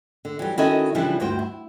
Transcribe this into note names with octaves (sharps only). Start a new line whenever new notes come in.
D3
E3 F#3 G3
D#3 C#4 E4 F#4 A4 D#5
C#3 E3 F3 G3 D4 E4
D2 G2 F#4 C5 G5
E4